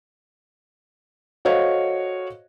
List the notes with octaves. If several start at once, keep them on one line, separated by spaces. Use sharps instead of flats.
F#4 A4 C5 C#5 D#5 F5